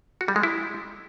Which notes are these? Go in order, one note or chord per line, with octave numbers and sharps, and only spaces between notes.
F#4
G3
G#3
E4